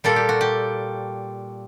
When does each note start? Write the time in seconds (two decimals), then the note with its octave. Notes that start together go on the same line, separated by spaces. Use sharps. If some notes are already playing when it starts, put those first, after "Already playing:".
0.04 A#2 G3 A#3 A4
0.16 G4
0.29 F#4
0.41 G4